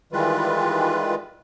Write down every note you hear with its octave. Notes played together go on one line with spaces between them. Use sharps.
D#3 E3 G3 G#3 F4 B4